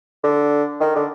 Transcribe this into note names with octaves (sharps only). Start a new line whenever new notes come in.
D3
D#3
D3